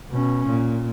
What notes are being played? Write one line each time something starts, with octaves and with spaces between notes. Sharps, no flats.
B2 C#4
A#2